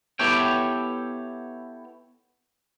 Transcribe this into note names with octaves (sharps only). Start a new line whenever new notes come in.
B3 E4 G4 A4 C#5 G5